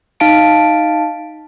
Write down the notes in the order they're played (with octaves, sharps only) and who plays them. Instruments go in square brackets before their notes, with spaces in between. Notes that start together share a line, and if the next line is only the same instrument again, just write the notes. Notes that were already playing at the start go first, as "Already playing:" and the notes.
[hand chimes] D#4 F5 A5 D7